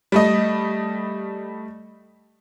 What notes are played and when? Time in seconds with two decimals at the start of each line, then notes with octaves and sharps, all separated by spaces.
0.12 G3 A3 D#5